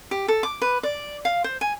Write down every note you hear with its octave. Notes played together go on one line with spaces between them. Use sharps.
G4
A4
D6
B4
D5
F5
C5
G#5